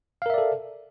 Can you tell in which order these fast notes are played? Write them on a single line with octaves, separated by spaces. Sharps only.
F5 A#4 E5 D5 A4